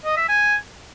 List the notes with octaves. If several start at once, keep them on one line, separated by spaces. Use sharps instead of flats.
D#5
E5
G#5